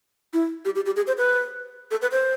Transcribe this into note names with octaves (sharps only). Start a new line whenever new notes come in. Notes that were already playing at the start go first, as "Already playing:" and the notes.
E4
G4
G4
G4
G#4
C5
B4
A4
B4
C5